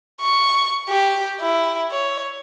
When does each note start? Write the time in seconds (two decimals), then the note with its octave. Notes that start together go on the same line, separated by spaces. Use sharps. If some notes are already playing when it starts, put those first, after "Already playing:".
0.21 C#6
0.89 G4
1.41 E4
1.91 C#5